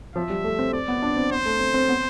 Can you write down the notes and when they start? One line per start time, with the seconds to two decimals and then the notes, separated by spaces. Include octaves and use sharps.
0.15 F3 E5
0.30 G3
0.44 A3
0.59 C4
0.73 C4 D5
0.88 B3
1.02 D4
1.17 C4
1.31 B3 C5
1.46 A3
1.60 C4
1.74 C4
1.89 B3